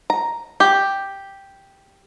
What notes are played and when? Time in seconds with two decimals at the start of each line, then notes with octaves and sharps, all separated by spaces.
0.10 A#5
0.60 G4